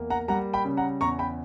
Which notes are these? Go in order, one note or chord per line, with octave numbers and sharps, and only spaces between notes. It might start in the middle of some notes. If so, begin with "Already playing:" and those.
Already playing: E2 A#3
F#5 A#5
G3 F#5 A#5
G5 B5
C#3
F#5 A#5
E2 A#5 C#6
G5 B5